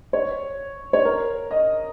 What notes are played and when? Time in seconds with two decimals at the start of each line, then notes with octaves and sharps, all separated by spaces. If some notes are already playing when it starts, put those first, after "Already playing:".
0.13 C#5
0.93 C#5
1.05 A#4
1.51 D#5